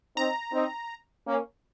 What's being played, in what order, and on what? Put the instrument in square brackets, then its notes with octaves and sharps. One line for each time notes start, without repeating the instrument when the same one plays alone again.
[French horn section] C4 D#4 [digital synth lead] A#5
[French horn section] C4 D#4
A#3 C#4